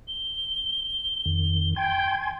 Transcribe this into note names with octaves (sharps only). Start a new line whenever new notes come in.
G7
F2 D#3
G5 G#5 C6 G#6